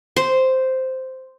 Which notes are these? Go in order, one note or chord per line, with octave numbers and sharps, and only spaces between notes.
C5